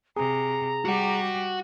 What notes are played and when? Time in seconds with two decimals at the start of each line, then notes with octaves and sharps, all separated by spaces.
0.16 C3 G#4 A#5
0.85 G3 F#4 G4 F#5